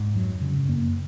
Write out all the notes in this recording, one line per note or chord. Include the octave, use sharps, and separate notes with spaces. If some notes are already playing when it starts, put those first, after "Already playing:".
Already playing: G#2
F2 F#3
C#3
F#2 A#3